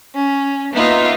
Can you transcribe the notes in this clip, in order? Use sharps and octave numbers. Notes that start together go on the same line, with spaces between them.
C#4
A#3 B3 D#4 F4 E5